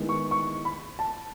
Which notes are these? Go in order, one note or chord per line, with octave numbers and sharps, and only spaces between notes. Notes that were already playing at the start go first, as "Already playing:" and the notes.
Already playing: D#3 G#3 B3 E4
C#6
C#6
B5
A5